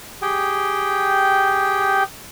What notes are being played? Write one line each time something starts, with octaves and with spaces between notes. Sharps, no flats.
G4 G#4 G5